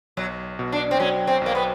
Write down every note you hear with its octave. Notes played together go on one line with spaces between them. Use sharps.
B1 F#3
B2
D4
C4
F#3 C#4
C4
B1 A#3
B3